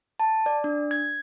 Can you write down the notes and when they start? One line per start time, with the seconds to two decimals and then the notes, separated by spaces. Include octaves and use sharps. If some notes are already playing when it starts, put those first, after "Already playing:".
0.20 A5
0.46 D5
0.64 D4
0.91 G#6